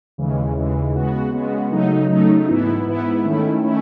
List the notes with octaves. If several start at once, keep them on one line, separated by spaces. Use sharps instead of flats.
D#2 C#3 E3 G#3
D#2 C#3 E3 G#3
C#3 G#3 B3 F#4
C#3 G#3 B3 F#4
C#3 F#3 A3 D#4
C#3 F#3 A3 D#4
G#2 E3 B3 E4
G#2 E3 B3 E4
D#3 A3 C#4 E4
D#3 A3 C#4 E4